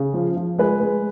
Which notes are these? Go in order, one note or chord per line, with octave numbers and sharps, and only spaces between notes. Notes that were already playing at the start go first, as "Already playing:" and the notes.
Already playing: C#3
F3
F3
G#3 B4
G#3